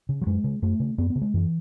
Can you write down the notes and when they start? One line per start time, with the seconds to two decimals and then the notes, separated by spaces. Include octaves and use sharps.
0.09 C#3
0.22 F#3
0.26 F#2 G#3
0.44 C#3
0.62 F#2 A3
0.80 C#3
0.98 F#2 B3
1.10 B3
1.15 C#3
1.21 G#3
1.34 F#2 E3